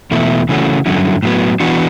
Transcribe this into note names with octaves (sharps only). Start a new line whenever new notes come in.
E2 B2 A3 E4
C#3 E3 A3 C#4 F#4
G2 D3 F#3 C#4 E4
A2 F#3 B3
E3 B3 D4 F#4